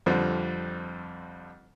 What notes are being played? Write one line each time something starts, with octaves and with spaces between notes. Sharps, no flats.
F2 D3 F3 G3 C4